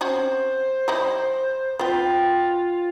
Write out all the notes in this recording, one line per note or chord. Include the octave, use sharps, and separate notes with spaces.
C4 C#4 F#4 C5
G3 D#4 E4
B3 C4 F4 C5 G5 B5